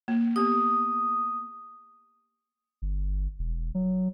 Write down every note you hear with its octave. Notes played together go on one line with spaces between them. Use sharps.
A#3
B3 G4 D#6
G1
E1
F#3